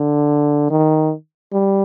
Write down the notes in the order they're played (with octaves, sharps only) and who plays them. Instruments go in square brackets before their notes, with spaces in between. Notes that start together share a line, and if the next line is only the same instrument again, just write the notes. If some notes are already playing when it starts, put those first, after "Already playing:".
Already playing: [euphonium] D3
D#3
G3